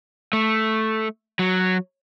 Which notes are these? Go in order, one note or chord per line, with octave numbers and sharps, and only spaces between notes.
A3
F#3